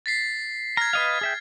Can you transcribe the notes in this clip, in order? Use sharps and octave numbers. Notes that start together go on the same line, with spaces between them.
A6 B6 C7
A#5 F6 G#6
B4 D#5 F5
G#4 E5 G5